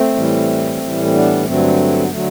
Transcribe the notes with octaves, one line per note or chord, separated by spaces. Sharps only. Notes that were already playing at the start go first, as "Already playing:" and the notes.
Already playing: A3 C4
A2 E3 G3
A2 E3 G3
C4
B3 D4
G2 D3 F#3 A3 C4
B3
D3 F#3 A3